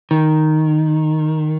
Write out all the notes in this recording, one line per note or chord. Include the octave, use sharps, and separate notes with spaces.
D#3